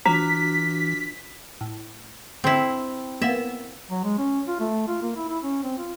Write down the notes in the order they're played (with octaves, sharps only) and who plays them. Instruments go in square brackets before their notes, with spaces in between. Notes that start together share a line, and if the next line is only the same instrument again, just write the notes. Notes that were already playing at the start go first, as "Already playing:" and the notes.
[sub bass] E3 [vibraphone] D4 F4 F#4 [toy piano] A#5 [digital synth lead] B6
[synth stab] A2
[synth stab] D3 [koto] C4 E4
[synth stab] A#3 B3 [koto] E5
[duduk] F#3
G#3
C#4
F4
A3
F4
A#3
E4
E4
C#4
C4
F4